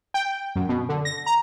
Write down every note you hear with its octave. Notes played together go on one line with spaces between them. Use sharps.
G5
F#2
B2
D3
A#6
A#5